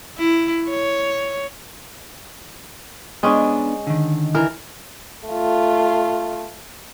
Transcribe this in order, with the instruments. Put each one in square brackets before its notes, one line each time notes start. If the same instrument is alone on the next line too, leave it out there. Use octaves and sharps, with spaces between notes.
[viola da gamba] E4
C#5
[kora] G#3 C#4 [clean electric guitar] B3 D4
[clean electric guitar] D3 D#3
[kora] E3 A#4
[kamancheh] A3 F4